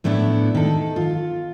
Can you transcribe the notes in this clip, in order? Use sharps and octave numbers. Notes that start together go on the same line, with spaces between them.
A2 A3 B3 D4 E4
D#3 A4
F4